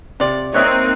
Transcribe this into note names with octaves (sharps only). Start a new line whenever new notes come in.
C3 F4 D5
A#3 C4 D#4 C#5 D#5 E5 F#6